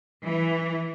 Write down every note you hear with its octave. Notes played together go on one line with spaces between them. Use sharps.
E3